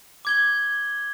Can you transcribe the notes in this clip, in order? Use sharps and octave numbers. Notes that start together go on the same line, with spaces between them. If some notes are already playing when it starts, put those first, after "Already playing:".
D6 G#6 G7